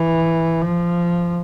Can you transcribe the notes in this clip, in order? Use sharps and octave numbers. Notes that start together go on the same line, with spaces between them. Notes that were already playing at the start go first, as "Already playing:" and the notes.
Already playing: E3
F3